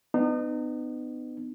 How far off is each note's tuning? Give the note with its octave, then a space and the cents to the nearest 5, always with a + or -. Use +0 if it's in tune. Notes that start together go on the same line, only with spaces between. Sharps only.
B3 +25 D#4 -35